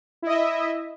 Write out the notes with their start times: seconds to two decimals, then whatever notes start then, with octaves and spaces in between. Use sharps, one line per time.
0.22 E4
0.26 D#5
0.30 E5